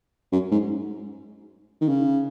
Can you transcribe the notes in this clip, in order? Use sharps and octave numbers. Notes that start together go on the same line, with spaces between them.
F#2
G#2
D#3
C#3